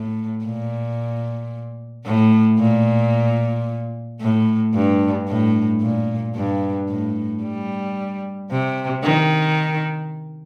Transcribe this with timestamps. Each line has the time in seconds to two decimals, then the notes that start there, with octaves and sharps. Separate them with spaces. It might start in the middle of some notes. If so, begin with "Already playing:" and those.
Already playing: A2
0.45 A#2
2.06 A2
2.59 A#2
4.21 A2
4.74 G2
5.28 A2
5.81 A#2
6.35 G2
6.89 A2
7.44 G3
8.51 C3
9.04 D#3